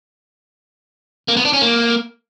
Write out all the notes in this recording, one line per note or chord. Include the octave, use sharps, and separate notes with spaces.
A#3
B3
D4
C#4
A#3